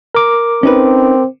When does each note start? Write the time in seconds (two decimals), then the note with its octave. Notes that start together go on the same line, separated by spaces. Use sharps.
0.15 A#4 D6
0.63 C4 C#4 D#4 B4